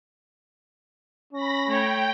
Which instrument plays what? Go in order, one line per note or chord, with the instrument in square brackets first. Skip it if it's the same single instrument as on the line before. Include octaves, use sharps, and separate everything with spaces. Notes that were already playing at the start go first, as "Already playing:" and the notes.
[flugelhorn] C#4 [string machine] B5 A#6
[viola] A3 C#5 [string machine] G5